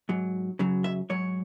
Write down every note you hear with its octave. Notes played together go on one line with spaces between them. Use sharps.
G#2 F#3
F#2 C#3 F#3
E5
G#2 F#3 C#5